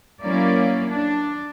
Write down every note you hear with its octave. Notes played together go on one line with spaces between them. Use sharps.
F#3 A#3 C#4 E4 D5
D4